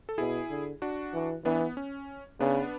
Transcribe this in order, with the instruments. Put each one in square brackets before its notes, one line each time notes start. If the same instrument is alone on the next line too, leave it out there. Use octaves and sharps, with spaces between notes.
[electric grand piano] A4
[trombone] B2 [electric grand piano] E4 G#4
[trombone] D3
[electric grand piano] D4 F#4
[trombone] E3
[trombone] E3 [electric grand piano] B3 D4
[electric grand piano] B3
C#4
[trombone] C#3 [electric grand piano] B3 D4